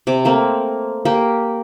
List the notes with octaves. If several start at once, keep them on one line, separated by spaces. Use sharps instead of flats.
C3 D6
A3 A#3 C4
A#3 G4